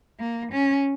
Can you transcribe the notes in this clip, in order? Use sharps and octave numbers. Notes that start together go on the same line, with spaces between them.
A#3
C#4